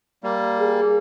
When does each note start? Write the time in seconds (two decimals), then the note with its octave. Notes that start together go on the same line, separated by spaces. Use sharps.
0.23 G3 A#3
0.60 G#4